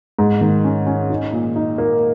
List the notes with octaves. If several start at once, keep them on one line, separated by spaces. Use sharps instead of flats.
G#2
D#3
C#4
C#4
D#4
A#2
D#4
A#3